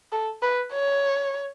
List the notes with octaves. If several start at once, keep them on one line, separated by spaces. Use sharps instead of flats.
A4
B4
C#5